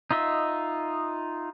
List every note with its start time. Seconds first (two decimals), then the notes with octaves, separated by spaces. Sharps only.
0.11 D#4 F4 D#5 E5